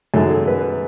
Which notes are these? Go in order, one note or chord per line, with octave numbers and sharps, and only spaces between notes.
F#2 D#3 G#3 A4
B4